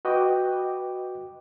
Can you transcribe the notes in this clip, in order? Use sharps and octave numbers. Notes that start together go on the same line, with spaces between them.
F#4 B4 D#5 G5 D6